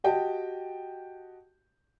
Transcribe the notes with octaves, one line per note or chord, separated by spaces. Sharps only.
F#4 G4 D#5 G5 A5